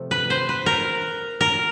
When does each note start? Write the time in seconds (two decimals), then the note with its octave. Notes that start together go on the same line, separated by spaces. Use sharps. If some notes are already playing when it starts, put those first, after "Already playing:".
Already playing: C3 F3 A3
0.11 B4
0.30 C5
0.49 B4
0.66 A#4
1.41 A#4